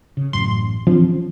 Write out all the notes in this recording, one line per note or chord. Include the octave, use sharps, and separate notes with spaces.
C#3
A1 F#2 C6
E3 F3 C4 D4
C#4